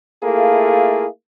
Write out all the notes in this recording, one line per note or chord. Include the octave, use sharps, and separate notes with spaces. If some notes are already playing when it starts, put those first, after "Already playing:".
A3 A#3 E4 F4 G#4 A4